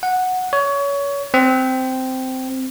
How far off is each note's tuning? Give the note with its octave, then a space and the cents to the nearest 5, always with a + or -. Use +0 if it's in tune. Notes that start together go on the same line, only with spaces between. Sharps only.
F#5 -5
C#5 +25
C4 -10